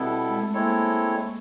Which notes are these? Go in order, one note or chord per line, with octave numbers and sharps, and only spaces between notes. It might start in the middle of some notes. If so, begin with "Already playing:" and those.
Already playing: B2 G3 B3 C4 E4 A4
G#3
A3
G#3 A#3 C4 E4 A4 C#5